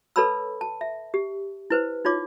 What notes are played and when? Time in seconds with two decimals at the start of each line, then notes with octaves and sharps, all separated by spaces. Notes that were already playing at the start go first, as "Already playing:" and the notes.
0.16 A4 B4 C#5 A5 B5 E6
0.61 A5
0.81 E5
1.14 G4
1.70 E4 B4 C5
2.05 D#4 F4 C#5 D6